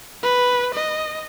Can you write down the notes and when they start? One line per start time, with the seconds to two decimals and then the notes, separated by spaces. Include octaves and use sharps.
0.23 B4
0.74 D#5